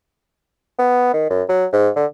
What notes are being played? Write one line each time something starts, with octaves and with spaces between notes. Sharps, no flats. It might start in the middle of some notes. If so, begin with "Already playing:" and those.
B3
D#3
F#2
F#3
G#2
D3